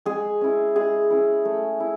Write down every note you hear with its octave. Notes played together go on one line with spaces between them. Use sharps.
G#3 G#4
C#4 E4
G#3 G#4
C#4 E4
A3
E4